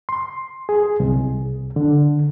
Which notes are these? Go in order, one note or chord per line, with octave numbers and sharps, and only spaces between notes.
C6
G#4
C2
D3